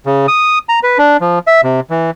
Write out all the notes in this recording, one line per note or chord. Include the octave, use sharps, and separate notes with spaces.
C#3
D#6
A#5
B4
D4
F3
E5
C3
E3